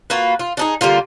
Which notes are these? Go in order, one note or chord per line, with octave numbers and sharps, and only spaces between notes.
A#3 F4 F#4 B4
F4
D4 D#4 G#4
D3 G3 A#3 F4